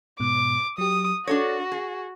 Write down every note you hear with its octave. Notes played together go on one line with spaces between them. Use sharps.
G#2 B2 D6
F#3 G4 D#6
D4 F#4 A4 C#5 A#6
G#4